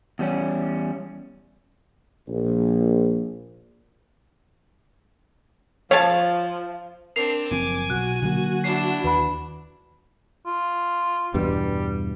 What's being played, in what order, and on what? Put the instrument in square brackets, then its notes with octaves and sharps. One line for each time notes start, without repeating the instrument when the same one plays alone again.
[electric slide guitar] E2 G3 C#4
[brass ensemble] A#1
[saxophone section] F3 [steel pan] C#5 [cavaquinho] F5 A5
[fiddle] C4 D4 [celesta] A#4 C7 F7
[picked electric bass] F#1 F3 C4 [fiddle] G#5 [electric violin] D6
[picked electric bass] B1 [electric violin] F#4 [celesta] F#6
[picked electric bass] D3 F#3 A#3 [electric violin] F#4
[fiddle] D4 E4 [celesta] C7
[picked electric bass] D#2 [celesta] B4 B5
[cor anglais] F4
[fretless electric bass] E2 G2 B2 [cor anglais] G3